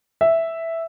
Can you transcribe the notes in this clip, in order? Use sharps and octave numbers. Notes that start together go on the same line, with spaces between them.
E5